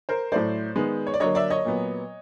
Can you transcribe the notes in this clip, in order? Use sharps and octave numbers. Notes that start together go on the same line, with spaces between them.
A#4 C5
A2 F#3 A3 C5 D5
D#3 G#3 B3
C#5
D5
D3 F#3 A#3 C#5 D#5
D5 E5
C#5 D#5
A#2 F#3 B3